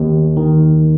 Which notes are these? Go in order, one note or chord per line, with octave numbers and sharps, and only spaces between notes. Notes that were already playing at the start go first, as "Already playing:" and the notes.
Already playing: D#2
D#3